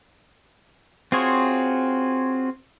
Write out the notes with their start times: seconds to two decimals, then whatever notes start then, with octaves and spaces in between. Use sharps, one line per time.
1.12 C4 F4 F#4 G#4 C#5